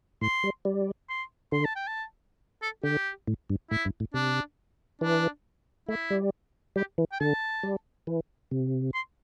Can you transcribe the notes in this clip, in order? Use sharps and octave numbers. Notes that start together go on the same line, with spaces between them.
A2 C6
G3
G3
C6
D3 C6
A5
G5
A5
A4
D3 G4
A2
G2
A2 E4
G2
A2
C3 D4
E3 D4
A3 E4
G3
G3 G4
E3
G5
D3 A5
G3
E3
C3
C6